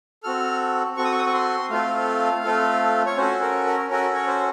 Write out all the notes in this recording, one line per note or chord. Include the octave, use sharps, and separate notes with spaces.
C4 F#4 A4 F6
C4 F#4 A4 C#6
D#6
C#6
D#6
C#6
C6
A3 C4 F4 A4 F5
A3 C4 F4 A4
C#5
C#4 F#4 A4 C5
A#4
A#4
C#4 F#4 A4 A#4
C#5
C5